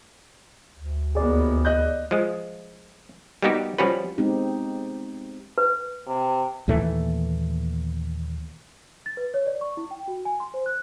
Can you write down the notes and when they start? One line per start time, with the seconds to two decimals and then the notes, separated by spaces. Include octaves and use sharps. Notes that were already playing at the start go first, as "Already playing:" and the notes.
0.76 D2
1.15 D#2 B3 G#4 D5
1.65 D#5 F#6 G6
2.11 F3 G#3
3.42 G3 A#3 B3 D#4 F#4 G4
3.78 F3 G3 C#4 F#4 B4
4.18 G#3 B3 C4 D#4 G4
5.58 B4
6.07 C3
6.68 D#2 A#2 E3 A3
9.06 A6
9.17 B4
9.34 C#5
9.47 D5
9.61 C#6
9.77 E4
9.91 G5
10.08 F#4
10.25 G#5
10.40 C6
10.54 C5
10.66 F#6